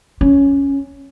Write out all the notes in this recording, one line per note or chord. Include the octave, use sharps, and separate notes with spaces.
C#4